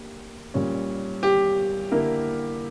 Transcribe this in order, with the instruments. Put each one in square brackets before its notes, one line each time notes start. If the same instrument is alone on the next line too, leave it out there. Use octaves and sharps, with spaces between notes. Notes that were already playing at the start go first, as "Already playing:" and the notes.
Already playing: [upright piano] A#3 D4 G4
A#2 G3 C#4
[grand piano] G4
[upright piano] D3 A#3 E4 A#4